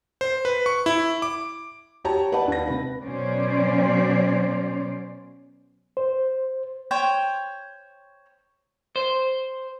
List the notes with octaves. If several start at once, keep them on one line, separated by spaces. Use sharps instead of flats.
C5
B4
C#6
E4
D6
F#4 G4 C#5 G5 A5 A#5
B4 D5 D#5 F#5 A5
D#2 F#5 A#6
C3 B4
B2 F#3 C#4 C5 D5
C5
C5 C#5 G5
C5